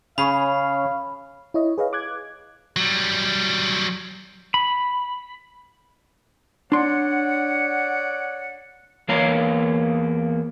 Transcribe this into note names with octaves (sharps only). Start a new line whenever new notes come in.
C#3 C#4 G#4 F5 B5
E4 C#5 D#5
G#4 B4 C#5 D#5 F5
D6 F#6 G#6
F#3 G3
B5
D4 C#5 D5 F#5 C6
E2 A#3 C#5 F5 A#5